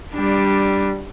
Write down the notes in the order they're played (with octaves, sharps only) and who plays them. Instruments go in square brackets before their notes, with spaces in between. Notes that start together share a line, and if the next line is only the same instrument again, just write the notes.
[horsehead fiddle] G3 D4